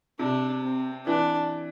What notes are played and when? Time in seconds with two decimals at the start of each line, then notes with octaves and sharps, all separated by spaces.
0.19 C3 D4
0.62 C4
1.06 E3 D4